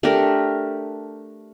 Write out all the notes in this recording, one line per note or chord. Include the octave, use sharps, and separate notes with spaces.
A3 D4 G4 A#4